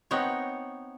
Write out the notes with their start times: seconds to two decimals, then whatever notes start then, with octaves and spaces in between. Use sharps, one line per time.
0.11 B3 C4 D#4 C#5